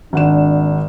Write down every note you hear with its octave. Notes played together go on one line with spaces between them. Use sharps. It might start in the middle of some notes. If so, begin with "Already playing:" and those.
G#1 D4 F#5 E7